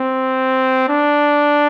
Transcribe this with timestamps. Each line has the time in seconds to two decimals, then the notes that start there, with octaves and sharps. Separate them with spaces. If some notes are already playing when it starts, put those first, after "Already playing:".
Already playing: C4
0.89 D4